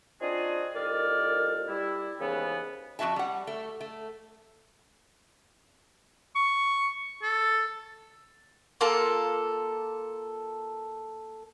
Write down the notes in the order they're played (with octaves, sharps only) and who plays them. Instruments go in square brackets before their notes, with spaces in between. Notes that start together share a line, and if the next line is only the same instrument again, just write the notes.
[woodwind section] C4 D4 D#4 F4 F#4 G#4
C2 A#2 D#3 A4 D5 F6
G3 E4
D#2 G#2 C#3 E3 B3
[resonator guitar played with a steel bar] F2 A#3 F#4 E5 A5
G3 F#5
A3
A3
[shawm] C#6
A4
[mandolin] A#3 F4 A4